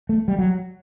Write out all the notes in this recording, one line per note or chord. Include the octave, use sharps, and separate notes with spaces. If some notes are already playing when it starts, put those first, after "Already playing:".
A3
G3
F#3